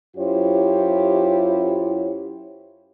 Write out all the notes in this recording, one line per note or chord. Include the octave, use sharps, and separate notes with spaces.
F#2 E4 F4 G4 C5 C#5